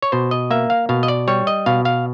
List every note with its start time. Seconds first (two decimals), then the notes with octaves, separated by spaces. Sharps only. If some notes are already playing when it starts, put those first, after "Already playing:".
0.02 C#5
0.12 B2 C5
0.31 D#5
0.51 A#3 E5
0.70 F5
0.89 B2 F5
1.03 D#5
1.08 D5
1.28 G3 C#5
1.47 D#5
1.66 B2 F5
1.85 F5